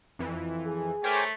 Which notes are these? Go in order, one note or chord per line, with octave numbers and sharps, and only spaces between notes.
F2 E3
G#4
A3 A#4 C5 C#5 G5 G#5 D6